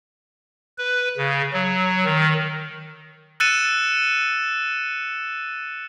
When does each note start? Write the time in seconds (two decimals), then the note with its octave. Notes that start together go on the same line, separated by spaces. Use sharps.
0.78 B4
1.18 C#3
1.53 F#3
2.05 D#3
3.40 E6 F#6 A6 C#7 D#7 E7